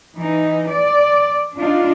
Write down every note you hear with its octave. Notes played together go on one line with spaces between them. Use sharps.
E3 D#4
D5
D4 D#4 F4